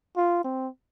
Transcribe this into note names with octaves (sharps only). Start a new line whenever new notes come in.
F4
C4